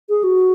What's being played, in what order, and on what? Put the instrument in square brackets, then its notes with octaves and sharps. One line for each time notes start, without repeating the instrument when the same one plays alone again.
[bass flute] G#4
F#4